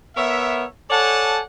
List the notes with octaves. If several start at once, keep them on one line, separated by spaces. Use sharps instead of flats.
B3 A#4 C#5 E5
A4 C#5 D5 F#5 G#5 A5